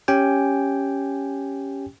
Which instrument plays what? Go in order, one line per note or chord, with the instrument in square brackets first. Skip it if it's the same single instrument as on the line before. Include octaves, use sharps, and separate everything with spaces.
[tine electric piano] C#4 G4 G5 G#5